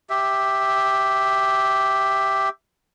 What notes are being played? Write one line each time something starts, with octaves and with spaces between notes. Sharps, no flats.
G4 E5